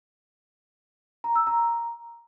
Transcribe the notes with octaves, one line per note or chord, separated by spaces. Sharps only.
A#5
E6
A#5